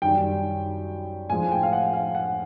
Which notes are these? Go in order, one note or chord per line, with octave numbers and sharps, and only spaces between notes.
F#2 D#3 G3 G5
A2 F3 G#3 G#5
G5
F5
F#5
F5
F#5